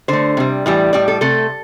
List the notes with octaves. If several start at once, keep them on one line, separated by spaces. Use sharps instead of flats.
D3 A3 C5
C3 G3
A2 E3 G3
A2 G3 D5
A4
C3 A3 A4